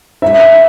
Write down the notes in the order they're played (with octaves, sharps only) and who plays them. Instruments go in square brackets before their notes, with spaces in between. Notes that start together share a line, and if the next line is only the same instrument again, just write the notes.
[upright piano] E5